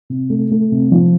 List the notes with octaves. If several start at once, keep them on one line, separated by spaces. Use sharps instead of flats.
C3
A3
A3
C3
F3